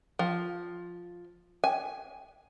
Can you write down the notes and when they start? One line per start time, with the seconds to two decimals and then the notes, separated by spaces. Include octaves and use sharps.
0.19 F3
1.64 G#5